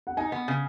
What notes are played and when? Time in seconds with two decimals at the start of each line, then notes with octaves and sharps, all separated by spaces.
0.07 F#5
0.17 D#4 G#5
0.32 B3
0.48 C#3